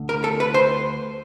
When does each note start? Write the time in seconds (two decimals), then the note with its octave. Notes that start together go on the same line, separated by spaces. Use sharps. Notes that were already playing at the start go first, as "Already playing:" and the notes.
Already playing: D2
0.09 A#4
0.24 A4
0.40 B4
0.54 C5